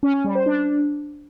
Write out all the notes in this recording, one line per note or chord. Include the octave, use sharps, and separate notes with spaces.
C#4
C#4
G3
C5
D4